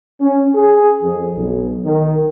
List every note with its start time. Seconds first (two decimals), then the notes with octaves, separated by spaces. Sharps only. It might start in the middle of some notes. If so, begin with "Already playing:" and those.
0.21 C#4
0.55 G#4
1.03 F2
1.35 B1
1.85 D#3